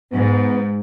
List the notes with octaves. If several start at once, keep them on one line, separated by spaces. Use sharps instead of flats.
G#2 B3